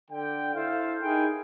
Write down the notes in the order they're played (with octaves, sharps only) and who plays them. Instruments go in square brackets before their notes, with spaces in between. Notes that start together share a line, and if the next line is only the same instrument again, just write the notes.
[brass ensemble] D3 G5
E4 A4 C5 F5
D#4 E4 G#4 A#4 G5 G#5